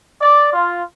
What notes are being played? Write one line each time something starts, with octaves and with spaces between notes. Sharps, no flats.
D5
F4